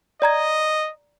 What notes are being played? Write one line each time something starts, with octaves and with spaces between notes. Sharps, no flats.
D5 D#5 A#5 G#6